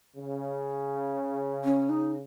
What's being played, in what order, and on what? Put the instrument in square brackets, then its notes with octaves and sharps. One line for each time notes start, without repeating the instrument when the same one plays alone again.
[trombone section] C#3
[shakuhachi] C#4
D#4